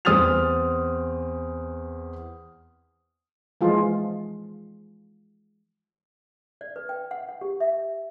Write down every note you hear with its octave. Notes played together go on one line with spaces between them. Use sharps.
E2 C4 D#6 F6 A6 F7
E3 F3 G#3 F4
D5
B4
G5
F#5
F#5
G4
E5